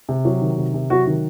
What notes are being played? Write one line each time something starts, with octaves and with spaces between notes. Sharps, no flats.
C3
F#3
D#3
C3
C3
F#3 F#4
D#3